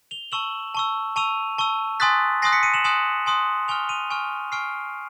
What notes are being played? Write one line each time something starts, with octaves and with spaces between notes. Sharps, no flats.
F7 G7
A5 C#6 E6 E7 F#7
A5 C#6 E6
A5 C#6 E6 D#7 F7
A5 C#6 E6
G#5 C6 D#6 F#6 A6 B6
G#5 C6 D#6 F#6 A#6 C7
B6 C#7
C#7 D#7
E7 F#7
G#5 C6 D#6 F#6 E7 F#7
G#5 C6 D#6 F#6
G#5 C#6 F6 F7 G7
D#7 F7
G#5 C#6 F6
G#5 C#6 F6 C7 D7